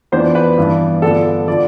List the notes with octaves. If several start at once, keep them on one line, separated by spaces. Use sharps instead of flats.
F2 E3 B3 D4 C5
B4
G2 E3 B3 D4
G2 D3 F3 B3 D4 A4
D3 F3 D5